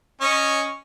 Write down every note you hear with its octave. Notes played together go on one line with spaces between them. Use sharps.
C#4 C#5 D#5